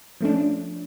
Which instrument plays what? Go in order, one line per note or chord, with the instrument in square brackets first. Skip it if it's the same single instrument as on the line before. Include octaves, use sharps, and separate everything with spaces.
[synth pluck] F3 A3 C#4 D4